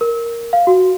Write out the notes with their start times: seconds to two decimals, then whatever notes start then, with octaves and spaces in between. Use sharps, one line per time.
0.01 A#4
0.53 F5
0.67 F#4